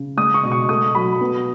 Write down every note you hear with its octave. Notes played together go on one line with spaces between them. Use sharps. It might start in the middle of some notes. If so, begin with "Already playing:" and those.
Already playing: C#3
G#3 D#6
C#6
B2
C#6
A3 D#6
F#3 B5
B3